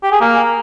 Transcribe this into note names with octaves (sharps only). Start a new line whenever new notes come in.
G4
G#4
A#3